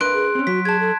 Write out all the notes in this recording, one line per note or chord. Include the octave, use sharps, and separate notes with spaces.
D4 A#4 B4 C6 F#6 D7
G#4
C4 C#4
F#3 F#4 B6
G#4 A5 G#6
A4